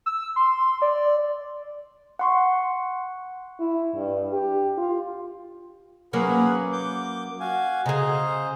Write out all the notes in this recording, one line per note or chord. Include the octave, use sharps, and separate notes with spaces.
E6
C6
D5
F#5 C6 C#6
E4
G2
G4
F4
F#3 A#3 C#4 G#4 B4 F#5
D6 G6
F#4 F5 G#5
C#3 G#4 C5 D#5 A#5